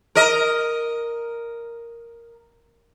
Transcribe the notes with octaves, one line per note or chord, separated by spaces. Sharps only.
A#4 D#5